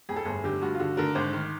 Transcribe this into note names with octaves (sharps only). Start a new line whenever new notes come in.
F2 G#4
A4
G1 G#4
D3 G4
G2 F#4
F4
D3 F#4
D3 A#4
G#1 C5
D#3